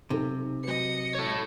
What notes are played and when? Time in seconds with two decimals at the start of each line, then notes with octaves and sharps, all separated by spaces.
0.10 B1 C3 D#4 A4
0.63 F#3 F#4 B4 D#5 C#7
1.15 A4 C#5